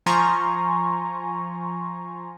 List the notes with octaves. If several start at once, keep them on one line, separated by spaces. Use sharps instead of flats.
F3 G#5 A#5 C6 C#6